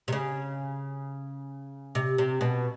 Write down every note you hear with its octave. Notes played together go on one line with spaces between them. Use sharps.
C3
C#3
C3
C3
B2